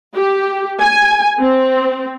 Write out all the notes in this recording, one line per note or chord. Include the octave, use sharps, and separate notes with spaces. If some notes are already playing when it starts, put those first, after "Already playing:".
G4
G#5
C4